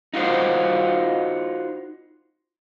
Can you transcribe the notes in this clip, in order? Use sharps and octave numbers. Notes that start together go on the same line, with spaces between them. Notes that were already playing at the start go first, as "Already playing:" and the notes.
D#4 F4 F#4 C5